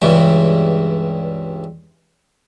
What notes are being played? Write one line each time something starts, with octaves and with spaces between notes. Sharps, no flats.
C#2 G2 E3